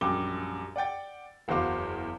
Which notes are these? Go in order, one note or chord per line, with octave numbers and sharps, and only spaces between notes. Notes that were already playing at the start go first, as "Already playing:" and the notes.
A#1 F#2 G3 G4 D6 G7
D5 F#5 G5 A6
F#1 E2 F#4 C5 F5 D6